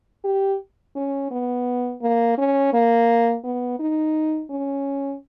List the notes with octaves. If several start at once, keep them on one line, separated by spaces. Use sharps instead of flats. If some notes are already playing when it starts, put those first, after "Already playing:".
G4
C#4
B3
A#3
C#4
A#3
B3
D#4
C#4